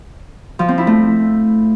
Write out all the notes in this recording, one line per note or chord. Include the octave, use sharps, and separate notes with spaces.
F3
C4
E4
A3